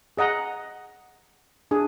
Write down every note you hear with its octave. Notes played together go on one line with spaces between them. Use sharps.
G#4 D#5 F#5 A#5
D4 G#4